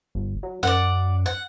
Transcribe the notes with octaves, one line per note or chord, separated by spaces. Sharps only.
G1
F#3
F#2 D5 F#5
F#5